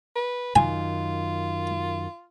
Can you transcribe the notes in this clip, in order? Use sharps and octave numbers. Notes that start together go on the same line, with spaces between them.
B4
F#2 D#3 F4 G#5